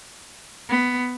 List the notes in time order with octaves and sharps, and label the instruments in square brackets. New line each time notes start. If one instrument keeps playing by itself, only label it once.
[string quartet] B3